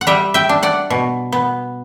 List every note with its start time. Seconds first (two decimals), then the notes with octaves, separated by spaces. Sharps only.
0.01 F#5
0.07 G3 E5 G5
0.34 E5 G5
0.49 D4
0.63 D5 F#5
0.90 B2
1.32 B3